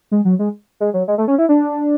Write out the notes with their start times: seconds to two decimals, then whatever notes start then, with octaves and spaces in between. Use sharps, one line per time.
0.11 G#3
0.25 F#3
0.39 G#3
0.80 G#3
0.94 F#3
1.08 G#3
1.18 A3
1.28 C#4
1.38 E4
1.49 D4